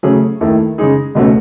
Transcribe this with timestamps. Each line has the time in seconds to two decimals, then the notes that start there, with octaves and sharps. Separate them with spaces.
0.03 C#3 F#3 A3 C#4 G#4
0.41 D#2 D#3 A3 E4 A4
0.78 C#3 G#3 D#4 G#4
1.15 C#2 B2 A3 C#4 F#4